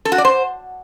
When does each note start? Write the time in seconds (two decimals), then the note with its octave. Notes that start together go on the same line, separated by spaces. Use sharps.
0.05 A4
0.12 F#4
0.18 D5
0.25 C5